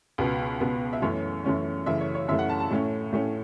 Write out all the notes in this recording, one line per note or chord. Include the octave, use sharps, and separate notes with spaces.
C#2 B2 B3
C#2 B2 B3
E5
F#2 E3 A3 C#4 C#5
F#2 E3 A3 C#4
F#2 C#3 E3 A3 E5
C#5
C#5
F#2 C#3 E3 A3 E5
F#5
A5
A5
A2 A3 C#4
A2 A3 C#4